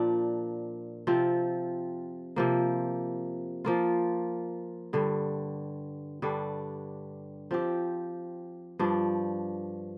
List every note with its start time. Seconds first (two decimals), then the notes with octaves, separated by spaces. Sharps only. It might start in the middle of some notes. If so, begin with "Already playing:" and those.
Already playing: A#2 F3 D4
1.07 C3 F3 C4 F4
2.36 C3 F3 A#3
3.65 F3 A#3 F4
4.93 G2 D3 G3
6.22 G2 D3 G3 D4
7.51 F3 C4 G4
8.79 G2 F3 D4